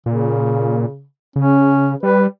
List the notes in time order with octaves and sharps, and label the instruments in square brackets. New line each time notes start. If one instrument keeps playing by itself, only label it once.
[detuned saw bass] A#2 [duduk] C#3
[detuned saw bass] C#3 [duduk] C#4
[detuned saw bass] G3 [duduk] B4